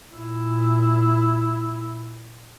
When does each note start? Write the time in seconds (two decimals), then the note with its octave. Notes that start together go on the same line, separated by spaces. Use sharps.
0.15 A#2 E4